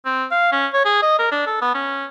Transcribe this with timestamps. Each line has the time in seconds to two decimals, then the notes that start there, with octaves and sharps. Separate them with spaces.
0.06 C4
0.31 F5
0.52 C#4
0.74 C#5
0.85 G#4
1.03 D#5
1.19 A#4
1.32 D4
1.47 A4
1.62 B3
1.75 C#4